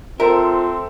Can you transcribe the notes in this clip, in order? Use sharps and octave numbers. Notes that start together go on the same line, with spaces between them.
C4 F4 A4 A#4 C5 E5